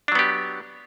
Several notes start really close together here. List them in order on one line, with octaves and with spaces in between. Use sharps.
D4 F#3 B3 G4